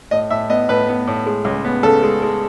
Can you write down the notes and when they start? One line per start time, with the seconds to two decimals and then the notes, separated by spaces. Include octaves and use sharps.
0.11 A2 D#5
0.30 A2 E5
0.50 B3 D#5
0.69 A2 B4
0.89 B3
1.07 A2
1.26 G#3
1.45 C#2
1.65 B3
1.83 C#3 A4
2.03 G#3
2.22 G#3